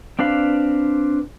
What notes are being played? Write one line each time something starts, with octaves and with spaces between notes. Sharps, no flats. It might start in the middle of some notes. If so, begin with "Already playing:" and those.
C4 D4 B4 F5 B5